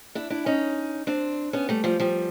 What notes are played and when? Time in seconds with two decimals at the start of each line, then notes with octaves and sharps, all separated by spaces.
0.15 D4 E4
0.30 D4 E4
0.46 C#4 D#4
1.07 C4 D4
1.53 B3 C#4
1.69 G3 A3
1.84 F3 G3
2.00 F3 G3